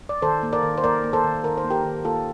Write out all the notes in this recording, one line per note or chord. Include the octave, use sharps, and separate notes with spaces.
D5
D#3 A4 C5
A#3
A#4 D5
D#3
C5
A#3 A#4 D5
A#3
A4 C5
D#3
D#3 A#4
C5
A#3
G4 A#4
D#3
A#3 F4 A4